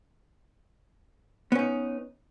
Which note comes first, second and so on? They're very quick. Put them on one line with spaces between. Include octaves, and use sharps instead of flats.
B3 C#4 D#4